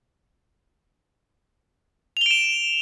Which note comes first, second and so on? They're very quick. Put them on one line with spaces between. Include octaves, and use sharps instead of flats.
F7 G7 D7 E7